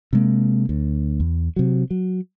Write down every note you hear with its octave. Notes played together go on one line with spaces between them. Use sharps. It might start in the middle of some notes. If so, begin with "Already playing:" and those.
C3 G#3 A#3
D2
E2
C3 F#3
F#3